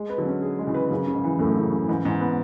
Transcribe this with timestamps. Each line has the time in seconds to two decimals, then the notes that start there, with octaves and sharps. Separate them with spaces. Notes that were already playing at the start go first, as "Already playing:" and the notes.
Already playing: G#3
0.10 B4
0.18 D3 F#3
0.26 C#4
0.42 G#4
0.59 G#3
0.67 C#3 E3
0.74 B4
0.91 F#2 C#3
1.07 C#3
1.15 G#2
1.24 E3
1.39 F#2 A2 A3
1.56 C#3
1.72 C#3
1.88 G#2 E3
2.05 G#2 E3
2.21 B3